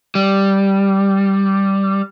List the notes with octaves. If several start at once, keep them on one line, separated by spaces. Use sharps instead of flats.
G3